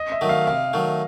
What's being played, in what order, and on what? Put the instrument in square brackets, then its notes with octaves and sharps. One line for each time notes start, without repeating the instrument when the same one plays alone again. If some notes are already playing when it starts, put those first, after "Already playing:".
Already playing: [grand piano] D#5
E5
[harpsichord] D#3 F#3 A3
[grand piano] F5
[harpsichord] C3 [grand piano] F5
[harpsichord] D#3 F#3 A3